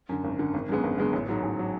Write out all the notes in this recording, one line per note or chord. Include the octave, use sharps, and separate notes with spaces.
F#2 D3
G#1
F#2 D3
G#1
F#2 D3 G#3 B3
G#1
F#2 D3 G#3 B3
A1
G#2 F#3
A1
F#3